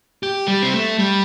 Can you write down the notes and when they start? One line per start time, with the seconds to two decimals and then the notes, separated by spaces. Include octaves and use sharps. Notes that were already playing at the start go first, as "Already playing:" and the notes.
0.23 G4
0.48 G3
0.62 C4
0.74 A3
0.98 G3